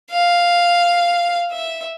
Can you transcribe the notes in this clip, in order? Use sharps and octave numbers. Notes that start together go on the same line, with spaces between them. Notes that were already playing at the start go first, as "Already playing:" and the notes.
F5
E5